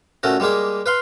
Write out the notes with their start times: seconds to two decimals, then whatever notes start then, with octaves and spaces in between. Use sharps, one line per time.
0.23 A#2 A3 C#4 F#4
0.40 G3 G#3 A#3 G4 G#4
0.86 B4 F5 C6